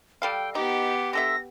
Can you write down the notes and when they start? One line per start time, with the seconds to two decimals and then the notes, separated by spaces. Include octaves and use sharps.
0.22 G3 A4 F5 G5
0.55 B3 D#4 G4 D6
1.13 D3 A4 E5 A#6